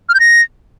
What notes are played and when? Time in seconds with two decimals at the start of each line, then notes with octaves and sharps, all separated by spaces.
0.09 F6
0.14 G6
0.20 A#6